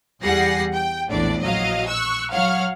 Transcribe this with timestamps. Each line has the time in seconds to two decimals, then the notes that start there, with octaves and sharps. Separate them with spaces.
0.22 E2 G3 G#4 F#5 A#6 C7
0.74 G5
1.10 A#1 E2 A2 D4 D5
1.40 A#1 F#3 D#5 F5
1.89 C#6 E6 F#6
2.32 F#3 C#5 F5 F#5 F6